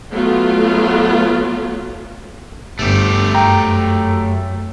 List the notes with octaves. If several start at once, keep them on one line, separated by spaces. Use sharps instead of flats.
F#3 A3 B3 F4
G1 A3 G4
F#2 G5 A#5